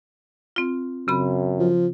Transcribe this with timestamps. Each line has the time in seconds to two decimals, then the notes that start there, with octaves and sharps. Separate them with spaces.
0.56 C4 F4
1.08 F#2 C#3 C4 B5
1.59 F3